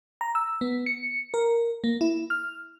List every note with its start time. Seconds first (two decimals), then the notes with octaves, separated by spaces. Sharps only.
0.21 A#5
0.35 E6
0.61 B3
0.86 C#7
1.34 A#4
1.84 A#3
2.01 E4
2.30 F6